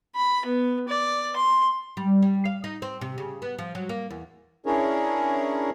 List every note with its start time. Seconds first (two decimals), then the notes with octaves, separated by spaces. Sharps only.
0.16 B5
0.46 B3
0.88 D5
1.36 C6
1.97 G3
2.22 G3
2.45 F5
2.64 D#4
2.82 C4
3.01 C3
3.18 C#3
3.42 B3
3.59 F3
3.75 F#3
3.89 A#3
4.10 E2
4.66 C#4 D4 E4 G#4 A#4 C#5